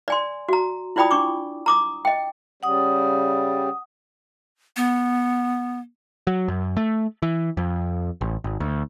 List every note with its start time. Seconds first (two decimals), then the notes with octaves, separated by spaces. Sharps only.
0.08 D5 G#5 C6
0.49 F#4 A#5
0.96 E4 F4 D5 G5 B5 D#6
1.11 D4 C#6 D6
1.66 A#5 D6 D#6
2.05 D#5 G5
2.63 C#3 G3 F#5 D#6
4.77 B3
6.27 F#3
6.48 F#2
6.77 A3
7.22 E3
7.57 F2
8.21 A1
8.44 G#1
8.60 D2